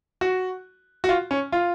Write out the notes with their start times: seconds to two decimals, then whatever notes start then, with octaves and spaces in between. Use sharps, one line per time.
0.21 F#4
1.04 F#4
1.09 F4
1.31 C#4
1.52 F4